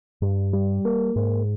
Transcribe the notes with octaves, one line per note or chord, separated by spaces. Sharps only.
G2
G3
A#3
G#2